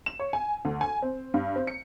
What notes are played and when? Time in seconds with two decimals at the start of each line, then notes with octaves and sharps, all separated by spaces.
0.06 E7
0.19 C#5
0.33 G#5
0.65 D2
0.81 G#5
1.02 C4
1.34 G2
1.56 C4
1.67 C#7